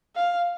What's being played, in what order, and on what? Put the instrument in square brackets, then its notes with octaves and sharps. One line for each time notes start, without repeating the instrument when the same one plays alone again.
[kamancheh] F5